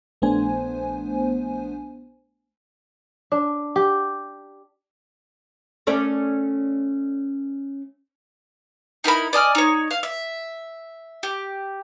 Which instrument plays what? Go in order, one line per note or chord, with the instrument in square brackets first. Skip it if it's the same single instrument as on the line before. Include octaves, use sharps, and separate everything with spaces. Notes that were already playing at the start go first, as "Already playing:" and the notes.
[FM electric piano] A#1 A3 B3 D4 C5 G#5
[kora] D4
G4
[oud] A3 C#4 D5
[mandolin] D#4 E4 A#4 B5
D5 D#5 G#5 F6
D#4 C#5
F5
E5
G4